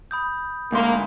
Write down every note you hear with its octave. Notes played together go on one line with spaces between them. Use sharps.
B5 D#6 G6
D2 G#2 A#3 C6